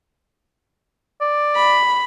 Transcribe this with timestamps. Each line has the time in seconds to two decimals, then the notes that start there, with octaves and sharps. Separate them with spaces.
1.21 D5
1.56 B5